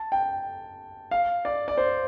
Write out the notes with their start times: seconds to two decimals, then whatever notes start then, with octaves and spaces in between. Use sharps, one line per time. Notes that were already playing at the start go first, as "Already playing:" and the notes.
Already playing: A5
0.12 G5
1.11 F5
1.45 D5
1.68 D5
1.78 C5